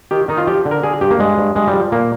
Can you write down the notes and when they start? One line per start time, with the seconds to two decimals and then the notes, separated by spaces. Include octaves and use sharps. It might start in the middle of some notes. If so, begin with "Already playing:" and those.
0.11 D#3 G4
0.28 D#3 D#4
0.37 F4
0.47 F3 G4
0.65 D3
0.71 A#4
0.83 D3 G#4
1.01 G2 G4
1.11 A#3
1.19 G2 G#3
1.38 G2
1.55 G2 G#3
1.68 G3
1.73 F3
1.92 A#2 A#3